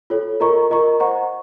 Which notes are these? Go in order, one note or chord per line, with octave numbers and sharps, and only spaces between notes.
F4 A4 C#5
F4 A#4 D#5 A#5 C#6
F4 A#4 D#5 A#5 C#6
C5 D#5 F#5 A#5 C#6